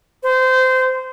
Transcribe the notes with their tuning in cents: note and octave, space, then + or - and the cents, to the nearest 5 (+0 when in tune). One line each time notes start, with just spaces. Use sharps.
C5 -20